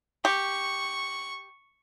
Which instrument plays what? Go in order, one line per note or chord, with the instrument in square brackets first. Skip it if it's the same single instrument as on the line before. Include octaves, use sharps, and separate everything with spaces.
[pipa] G4 [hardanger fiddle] C#6